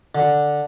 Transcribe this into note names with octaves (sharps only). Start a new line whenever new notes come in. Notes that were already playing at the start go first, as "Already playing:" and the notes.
D3